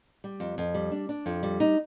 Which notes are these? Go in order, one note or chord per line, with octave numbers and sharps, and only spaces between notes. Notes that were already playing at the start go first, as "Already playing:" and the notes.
G3
F2
F2
G3
D4
D4
F2
G3
D#4